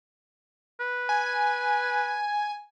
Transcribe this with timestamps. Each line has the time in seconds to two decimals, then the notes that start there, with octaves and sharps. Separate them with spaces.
0.80 B4
1.09 G#5